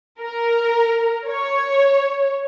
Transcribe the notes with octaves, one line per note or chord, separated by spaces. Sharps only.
A#4
C#5